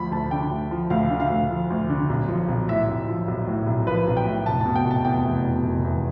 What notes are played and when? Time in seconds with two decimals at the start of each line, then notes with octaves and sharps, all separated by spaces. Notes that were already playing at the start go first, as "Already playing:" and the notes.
Already playing: D2 F3 B5
0.11 D2 A5
0.31 D3 G5
0.51 D2
0.71 F3
0.90 D2 F5
1.10 D3
1.20 F5
1.30 D2
1.50 F3
1.70 D2
1.90 D3
2.09 B1
2.28 F3
2.48 B1
2.69 A2 E5
2.88 B1
3.08 F3
3.28 B1
3.47 A2
3.67 B1
3.87 F3 B4
4.07 B1
4.17 G5
4.26 A2
4.46 F1 A5
4.61 B2 A5
4.75 G5
4.86 F1
4.91 A5
5.05 E2 G5
5.25 F1
5.44 B2
5.65 F1
5.84 E2